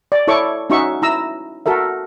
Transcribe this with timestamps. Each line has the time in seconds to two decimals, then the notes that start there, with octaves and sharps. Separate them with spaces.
0.12 D5
0.27 E4 A4 C#5 C#6 D6
0.70 C#4 D#4 F#4 E5 C#6
1.02 E4 A#5 E6
1.66 F#4 A4 A#4 E5